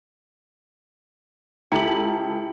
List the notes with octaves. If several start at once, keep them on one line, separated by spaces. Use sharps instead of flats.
C#2 E4 G4 A4 G5 A#5 F#7